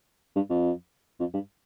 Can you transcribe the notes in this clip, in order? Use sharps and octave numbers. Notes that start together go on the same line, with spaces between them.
G2
F2
F2
G2